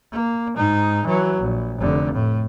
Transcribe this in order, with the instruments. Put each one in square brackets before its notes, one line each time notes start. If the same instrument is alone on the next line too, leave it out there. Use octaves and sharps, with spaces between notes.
[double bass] A#3
G#2 D#4
E3 F#3
A#1
F1 D3
A2